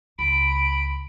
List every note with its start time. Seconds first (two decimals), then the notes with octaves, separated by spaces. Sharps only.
0.19 C#2 B5 D7